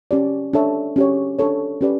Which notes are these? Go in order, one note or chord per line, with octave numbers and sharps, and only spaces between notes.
C#4 G4 D5
D4 A4 C#5 E5 A5
C#4 G4 C#5
D4 A4 C#5
C#4 G4 B4 D5